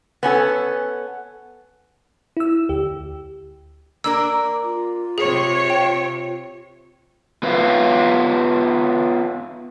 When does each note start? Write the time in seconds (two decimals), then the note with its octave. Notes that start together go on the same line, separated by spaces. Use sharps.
0.23 B3 C#4 G4 A4
2.37 E4 E6
2.69 D2 G4
4.04 A#3 D4 A#4 E6
4.63 F4
5.18 C3 G#4 C#5
5.70 G5
7.43 B3 F4 B4 E5 F5